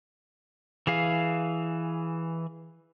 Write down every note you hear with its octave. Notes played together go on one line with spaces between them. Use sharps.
E3 G#4 F5